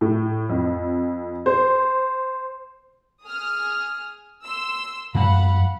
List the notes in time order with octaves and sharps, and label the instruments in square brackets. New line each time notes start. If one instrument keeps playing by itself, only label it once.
[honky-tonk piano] A2
F2
C5
[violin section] G#4 D#6 F6
C6 E6
[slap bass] F#2 F3 G#3 [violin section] F5 F#5 B5